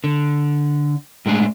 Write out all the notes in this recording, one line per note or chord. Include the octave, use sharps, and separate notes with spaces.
D3
A2 G#3 D4 G#4